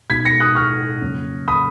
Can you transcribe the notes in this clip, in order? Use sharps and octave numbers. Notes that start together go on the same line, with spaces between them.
B2 G#3 D#4 G#6 B6
A#6 C#7
D#6 F#6
C#6 F6
F2 C#3 F#3 A#3 C#4
B5 D#6